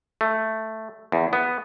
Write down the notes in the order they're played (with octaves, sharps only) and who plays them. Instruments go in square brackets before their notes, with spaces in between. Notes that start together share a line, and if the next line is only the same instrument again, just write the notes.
[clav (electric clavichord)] A3
E2
B3